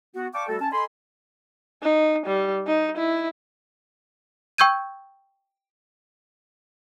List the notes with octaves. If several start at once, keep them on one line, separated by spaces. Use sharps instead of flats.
B3 F#4
D5 F5 G5 A5 C#6 D6
G3 A3 F#4 A4
C#4 A5
A4 D#5 G#5 B5 C6
D#4
G3
D#4
E4
G5 C#6 E6 G6 G#6 D#7